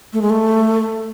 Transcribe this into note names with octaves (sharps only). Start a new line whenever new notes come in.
A3
G#3
A3